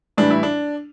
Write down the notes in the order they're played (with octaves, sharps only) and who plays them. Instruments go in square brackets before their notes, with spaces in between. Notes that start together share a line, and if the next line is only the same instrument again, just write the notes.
[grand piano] A2 E3 G3 D4
E4
D4